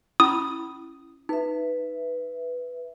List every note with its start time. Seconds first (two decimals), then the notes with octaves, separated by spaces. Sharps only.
0.20 C#4 E4 B5 D#6
1.29 D#4 B4 E5